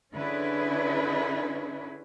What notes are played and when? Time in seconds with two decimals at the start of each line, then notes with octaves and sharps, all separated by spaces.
0.13 D3 C#4 D4 E4 G#4 B4